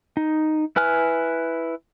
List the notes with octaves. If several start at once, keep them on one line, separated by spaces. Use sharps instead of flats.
D#4
E4 B4 G#5 F6